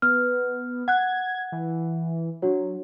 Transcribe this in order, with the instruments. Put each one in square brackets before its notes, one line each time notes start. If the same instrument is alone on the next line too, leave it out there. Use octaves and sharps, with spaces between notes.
[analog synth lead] B3 [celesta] F6
[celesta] F#5 F#6 [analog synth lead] G#6
[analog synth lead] E3
[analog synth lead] F#3 [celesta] D4 F#4 C#5